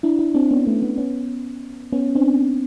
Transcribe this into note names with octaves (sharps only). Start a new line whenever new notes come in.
D4 E4
D4 E4
C4 D4
B3 C#4
A3 B3
A3 B3
B3 C#4
B3 C#4
C4 D4